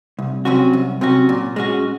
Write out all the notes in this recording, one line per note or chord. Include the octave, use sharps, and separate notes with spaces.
C2
C3 F#3 C#4 F#4
C2
C3 F#3 C#4 F#4
A#2
G#3 C#4 F#4